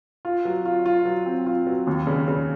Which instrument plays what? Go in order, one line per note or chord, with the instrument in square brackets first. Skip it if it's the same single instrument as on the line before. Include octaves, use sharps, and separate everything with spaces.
[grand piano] F4
F#3
F4
F4
F#3
C4
F4
F#3
D#2
C#3
C#3